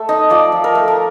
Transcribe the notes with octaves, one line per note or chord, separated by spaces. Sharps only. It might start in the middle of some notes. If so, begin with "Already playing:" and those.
Already playing: A3
D#4 D#5
F3 D5
F3
A#4
A3
A#4